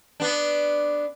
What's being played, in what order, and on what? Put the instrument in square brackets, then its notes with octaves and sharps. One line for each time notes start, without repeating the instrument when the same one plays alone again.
[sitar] B3 D4